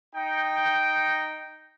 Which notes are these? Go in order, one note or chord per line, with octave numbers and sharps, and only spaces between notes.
D#4 G5